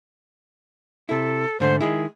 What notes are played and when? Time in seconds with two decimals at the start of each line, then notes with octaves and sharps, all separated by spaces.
1.09 C3 E4 A4
1.60 G#2 D3 A3 C5
1.80 D#3 G#3 E4 G#4